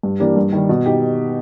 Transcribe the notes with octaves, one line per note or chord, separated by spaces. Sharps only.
G2
E3 G3 A#3 D4
G2
D#3 G3
B2
D#4 G4